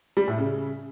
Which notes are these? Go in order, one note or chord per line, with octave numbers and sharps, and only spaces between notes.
G3
A2
C#3